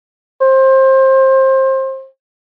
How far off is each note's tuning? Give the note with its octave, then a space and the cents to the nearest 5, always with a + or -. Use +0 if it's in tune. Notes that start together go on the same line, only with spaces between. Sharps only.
C5 +25